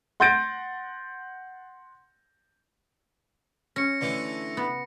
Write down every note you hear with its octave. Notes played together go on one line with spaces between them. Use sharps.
F#5 C6 G6 A6 A#6 D7
C#4 A#6 C#7
D3 E3 A3
B3